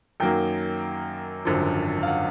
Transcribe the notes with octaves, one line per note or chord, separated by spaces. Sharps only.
F#2 D#3 F#3 A#3 G5
G#1 F#2 D3 F3
F5
F#5